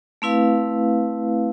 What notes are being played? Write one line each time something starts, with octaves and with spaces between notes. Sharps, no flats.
A3 C4 E4 B4 F5